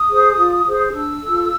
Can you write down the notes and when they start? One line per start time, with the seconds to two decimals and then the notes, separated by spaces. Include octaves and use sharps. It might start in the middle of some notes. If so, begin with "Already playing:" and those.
Already playing: D#6
0.09 G#4 C5
0.37 F4
0.65 G#4 C5
0.94 D4 E6
1.22 F4 A4